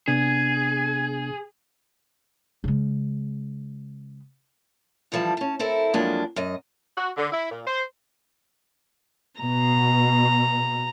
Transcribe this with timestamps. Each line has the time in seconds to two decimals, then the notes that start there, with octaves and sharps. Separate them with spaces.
0.08 C3 B3 D4 G#4 G#6
2.64 C#3 G#3
5.12 D3 E3 F3 G3 A5
5.37 C#4 A5
5.59 C4 E4 A4 A#4
5.94 F2 F#3 G#3 A#3 D4
6.36 F#2 D#5
6.98 F#4
7.17 D3
7.32 E4
7.51 A#2
7.67 C5
9.41 B2 A#5